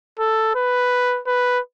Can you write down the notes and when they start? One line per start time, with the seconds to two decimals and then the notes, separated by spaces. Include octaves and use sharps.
0.19 A4
0.55 B4
1.27 B4